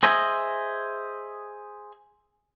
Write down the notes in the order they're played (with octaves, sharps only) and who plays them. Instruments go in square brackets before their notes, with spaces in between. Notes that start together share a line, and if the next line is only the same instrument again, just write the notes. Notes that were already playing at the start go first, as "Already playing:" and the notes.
[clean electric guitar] G#4 C5 D#5 E5 G#5